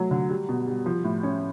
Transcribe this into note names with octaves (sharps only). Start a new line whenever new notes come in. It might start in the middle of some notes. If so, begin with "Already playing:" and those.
Already playing: F#3 A3
D3
G3
B2
G3
F3
A2
C#4